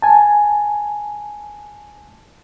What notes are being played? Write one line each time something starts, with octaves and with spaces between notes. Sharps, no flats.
G#5 A5